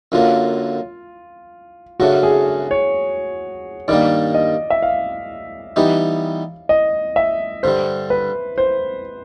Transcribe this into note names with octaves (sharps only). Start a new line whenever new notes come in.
F#2 D3 F#3 A#3 F4
F#2 C#3 F#3 A3 D4 F#4
G#4
C#5
G2 D#3 G3 A#3 D5
D#5
E5
F5
E3 G3 B3 D#4 G4
D#5
E5
G2 D3 G3 C5
B4
C5